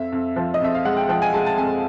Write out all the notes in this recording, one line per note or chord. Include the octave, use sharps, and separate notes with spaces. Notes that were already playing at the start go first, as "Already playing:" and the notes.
Already playing: F2 E5
F2
F3
D#5
F2 E5
F5
G#3 F#5
G5
F3 G5
G#5
G#3 A5
A5
F2 G#5